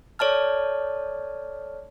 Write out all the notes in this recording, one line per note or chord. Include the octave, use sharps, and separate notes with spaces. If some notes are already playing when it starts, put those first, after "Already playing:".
A4 C#5 D5 A5 F6